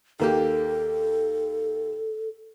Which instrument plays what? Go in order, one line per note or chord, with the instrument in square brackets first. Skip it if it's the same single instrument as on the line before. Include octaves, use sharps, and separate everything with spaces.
[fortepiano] D#2 A#3 G4 [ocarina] A4